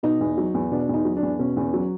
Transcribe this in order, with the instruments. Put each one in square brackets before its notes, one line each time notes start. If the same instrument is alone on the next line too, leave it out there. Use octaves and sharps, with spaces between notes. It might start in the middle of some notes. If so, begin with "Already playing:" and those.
[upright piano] B2 D#4
E2
F#3
E2
B2 D4
E2 D#4
F#3
D4
E2
B2 C#4
E2
F#3